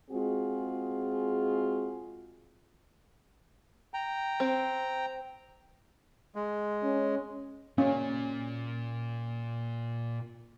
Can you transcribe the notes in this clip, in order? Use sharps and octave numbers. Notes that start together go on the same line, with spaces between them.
G#3 C4 F4 F#4 G#4
G5 A#5
C4
G#3
C#4
A#2 C#4